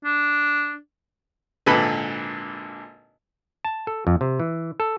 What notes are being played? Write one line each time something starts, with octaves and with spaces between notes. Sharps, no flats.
D4
G#1 A#2 D3 A4 B4 B5
A5
A4
F2
C3
E3
A4